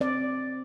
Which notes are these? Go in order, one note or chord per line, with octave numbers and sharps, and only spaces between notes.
C4 D5